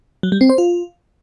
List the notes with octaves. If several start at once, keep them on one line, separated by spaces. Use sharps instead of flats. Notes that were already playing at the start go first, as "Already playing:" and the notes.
F#3
G3
C4
C5
F4